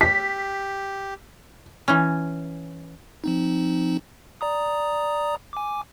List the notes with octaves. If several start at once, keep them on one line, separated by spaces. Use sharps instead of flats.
G4 B6
E3 C#4
F3 C4 D#4
D5 A#5 D#6
G#5 D6